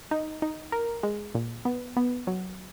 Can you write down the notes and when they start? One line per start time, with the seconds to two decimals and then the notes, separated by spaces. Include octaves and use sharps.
0.11 D#4
0.42 D#4
0.72 A#4
1.03 G#3
1.35 A#2
1.65 B3
1.97 B3
2.27 F#3